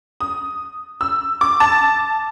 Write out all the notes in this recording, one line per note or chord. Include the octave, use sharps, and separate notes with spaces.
D#6
E6
D6
A5